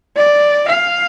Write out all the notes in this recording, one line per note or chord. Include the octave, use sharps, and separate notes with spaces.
D5
F5